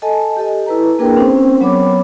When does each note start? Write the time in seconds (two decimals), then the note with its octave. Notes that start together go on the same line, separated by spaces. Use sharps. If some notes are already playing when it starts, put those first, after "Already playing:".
0.02 A4 D#5 G#5 A5
0.37 G4 A4 D#5
0.66 E4 B4 A#5
0.99 A#3 D4 G#4 A#4 B4 G5
1.16 C4 C#4 C5
1.61 F#3 B3 C#5 B5 D6